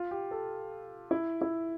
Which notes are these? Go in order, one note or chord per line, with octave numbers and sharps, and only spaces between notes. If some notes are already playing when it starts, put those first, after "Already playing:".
Already playing: F4
G4
A4
E4
E4